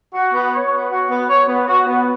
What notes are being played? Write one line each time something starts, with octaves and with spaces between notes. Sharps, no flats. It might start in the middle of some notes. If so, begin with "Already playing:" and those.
F#4
B3
C#5
B3
F#4
B3
C#5
B3
F#4
B3